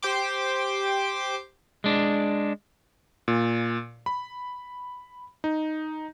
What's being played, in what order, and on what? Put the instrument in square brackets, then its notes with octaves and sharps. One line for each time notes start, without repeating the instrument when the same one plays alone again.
[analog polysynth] G4 C5 G5 C6 D6
[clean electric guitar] G#3 D4
[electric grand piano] A#2
B5
D#4